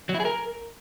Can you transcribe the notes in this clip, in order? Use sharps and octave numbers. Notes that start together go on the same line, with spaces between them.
F#3
E4
G#4
A#4